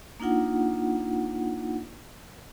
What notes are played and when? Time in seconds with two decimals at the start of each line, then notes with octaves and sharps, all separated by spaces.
0.20 A#3 D4 D#4 F4 F#5